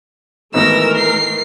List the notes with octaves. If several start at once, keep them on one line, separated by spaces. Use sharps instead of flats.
G#1 E3 A3 B3 D#4 A#4 E6 A#6
C7